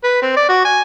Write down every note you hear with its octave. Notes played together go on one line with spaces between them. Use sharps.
B4
C4
D5
F#4
G#5